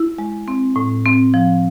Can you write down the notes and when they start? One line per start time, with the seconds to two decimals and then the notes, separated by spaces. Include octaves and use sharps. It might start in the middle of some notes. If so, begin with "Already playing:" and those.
Already playing: E4
0.18 G#3
0.48 C4
0.76 A2
1.05 C4
1.34 F3